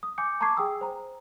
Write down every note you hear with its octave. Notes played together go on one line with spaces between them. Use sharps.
D#6
G#5 D6 G6 C#7
A5 A#5 C#6 D6 G#6 C7
G#4 G5 G#5 D#6 E6
C5 A#5